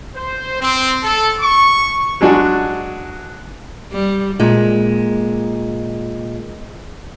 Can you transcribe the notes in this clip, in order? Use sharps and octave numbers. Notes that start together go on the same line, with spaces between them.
C5
C4
A4
C#6
F#3 G#3 D4 F#4
G3
A#2 G#3